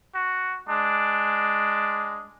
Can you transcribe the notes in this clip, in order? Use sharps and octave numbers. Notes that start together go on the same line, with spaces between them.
F#4
G#3 D4